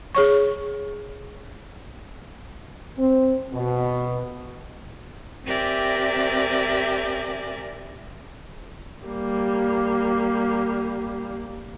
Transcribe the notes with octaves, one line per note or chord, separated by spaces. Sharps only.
G#4 C#5 C#6
C4
B2
C4 G4 A#4 D5 E5 G#5
G3 A#3